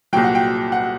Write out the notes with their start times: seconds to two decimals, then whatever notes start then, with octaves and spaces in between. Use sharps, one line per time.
0.13 C2 A#2 F#3 G5
0.24 F#5
0.35 G5
0.72 F#5